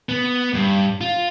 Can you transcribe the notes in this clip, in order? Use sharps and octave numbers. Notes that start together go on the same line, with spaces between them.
B3
G2
F4